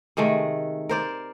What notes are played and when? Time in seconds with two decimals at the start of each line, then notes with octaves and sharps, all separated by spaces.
0.17 C3 D#3 G#3 A3
0.89 A#4 C5 D5